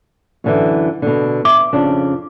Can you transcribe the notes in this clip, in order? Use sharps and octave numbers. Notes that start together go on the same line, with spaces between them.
F#2 D3 E3
B2 D3
E5 D6
F2 C#3 D4